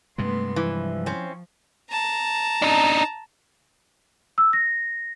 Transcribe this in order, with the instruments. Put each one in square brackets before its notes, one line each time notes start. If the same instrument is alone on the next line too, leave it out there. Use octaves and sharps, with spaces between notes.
[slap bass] G2 C3 G#3 [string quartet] A3 B3 C6
[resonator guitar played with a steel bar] E3 [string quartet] F3
[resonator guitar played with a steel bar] C4 C#4
[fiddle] A5 A#5
[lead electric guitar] D4 D#4
[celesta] E6
A#6